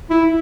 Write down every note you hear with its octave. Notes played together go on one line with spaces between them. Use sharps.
E4